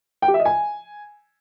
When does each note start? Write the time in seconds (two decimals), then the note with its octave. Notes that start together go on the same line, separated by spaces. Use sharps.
0.22 G5
0.28 G4
0.34 E5
0.40 D#5
0.45 G#5